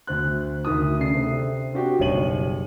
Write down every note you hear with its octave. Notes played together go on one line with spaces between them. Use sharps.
D2 C5 F#6
D2 D#3 D#6
C#3 A3 D4 C7
C3 A4 C5
C4 D4 F#4 G4
F#1 B1 G3 C#5 D#7 F#7